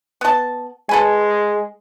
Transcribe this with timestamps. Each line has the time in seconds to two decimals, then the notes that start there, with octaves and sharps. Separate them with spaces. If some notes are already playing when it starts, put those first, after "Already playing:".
0.21 B3 A5
0.89 G#3 A4 B4 G#5